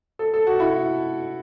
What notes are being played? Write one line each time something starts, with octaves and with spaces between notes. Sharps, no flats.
A4
A4
F#4
E4